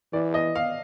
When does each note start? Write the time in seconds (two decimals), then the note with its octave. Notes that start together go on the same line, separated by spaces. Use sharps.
0.13 E3 D5
0.34 D#5
0.55 F5